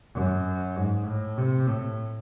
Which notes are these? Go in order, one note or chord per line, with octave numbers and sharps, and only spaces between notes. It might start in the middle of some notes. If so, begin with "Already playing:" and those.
F#2
G#2
A2
C3
A2